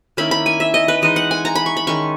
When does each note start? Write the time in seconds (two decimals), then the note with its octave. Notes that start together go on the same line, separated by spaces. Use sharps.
0.17 D#3 A#3 C#4 E4 B5
0.31 B5
0.46 G#5
0.60 E5
0.74 D#5
0.88 B4
1.02 E3 G#3 D#4 D#5
1.16 F#5
1.31 G#5
1.45 A#5
1.55 B5
1.66 C#6
1.77 B5
1.87 D#3 G#3 C#4 C#6